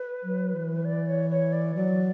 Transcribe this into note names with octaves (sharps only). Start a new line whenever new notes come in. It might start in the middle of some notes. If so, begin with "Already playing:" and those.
Already playing: B4
F#3
E3
D5
C#5
C#5
D5
F#3 D5